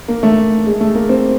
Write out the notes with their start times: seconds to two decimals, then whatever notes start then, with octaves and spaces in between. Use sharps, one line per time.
0.08 A#3
0.23 A3
0.66 G#3
0.80 A3
0.95 A#3
1.09 C4